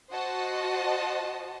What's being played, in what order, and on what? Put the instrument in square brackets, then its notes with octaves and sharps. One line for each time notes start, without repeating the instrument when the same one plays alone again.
[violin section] F#4 C5 D#5 A5